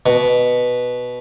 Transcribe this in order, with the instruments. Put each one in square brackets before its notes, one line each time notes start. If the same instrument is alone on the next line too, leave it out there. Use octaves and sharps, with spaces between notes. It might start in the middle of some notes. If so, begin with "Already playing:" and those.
[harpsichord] B2